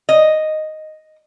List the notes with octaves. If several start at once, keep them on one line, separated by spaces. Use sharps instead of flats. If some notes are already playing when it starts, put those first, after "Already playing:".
D#5